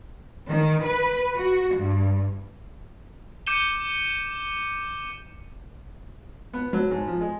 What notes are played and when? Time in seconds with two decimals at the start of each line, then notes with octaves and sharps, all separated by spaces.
0.49 D#3
0.84 B4
1.37 F#4
1.76 G2
3.47 D6 G6 C#7 D#7 E7 G7
6.53 B3
6.73 F#3
6.91 G#2
7.07 F3
7.21 G#3